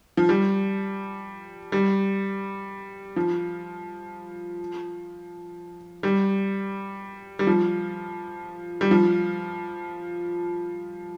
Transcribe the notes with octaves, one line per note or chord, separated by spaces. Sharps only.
F3
G3
G3
F3
G3
G3
F3
G3
F3